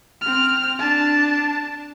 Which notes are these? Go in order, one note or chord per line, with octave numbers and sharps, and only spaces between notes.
C4 F6
D4 A5